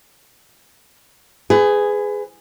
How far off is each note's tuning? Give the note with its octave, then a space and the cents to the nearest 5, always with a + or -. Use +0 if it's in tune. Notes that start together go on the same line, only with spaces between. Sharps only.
G#4 +0 B4 +30